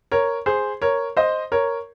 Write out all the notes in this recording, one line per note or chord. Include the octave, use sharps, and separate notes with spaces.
A#4 C#5
G#4 C5
A#4 C#5
C5 D#5
A#4 C#5